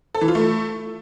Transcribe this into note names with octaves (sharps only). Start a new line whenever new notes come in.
A4
E3
F4
A3